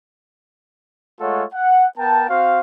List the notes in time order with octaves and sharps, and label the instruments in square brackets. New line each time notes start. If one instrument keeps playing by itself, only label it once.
[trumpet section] G#3 A3 F4 A4 C#5 F#5
F#5
B3 A#4 G5 A5
C4 F#4 C5 F5